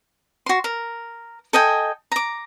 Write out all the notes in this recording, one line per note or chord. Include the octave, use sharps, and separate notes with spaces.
F#4 C6
A#4
A4 D#5 G5 G#5
A#5 D6